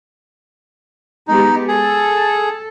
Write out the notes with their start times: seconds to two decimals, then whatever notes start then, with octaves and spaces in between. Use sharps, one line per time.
1.28 G#3 B3 D#4 G4
1.68 G#4 A4